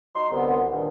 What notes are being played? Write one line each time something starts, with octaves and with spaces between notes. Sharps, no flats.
F#3 D#4 C6
C2 D3 B3
G2 A#2 D#3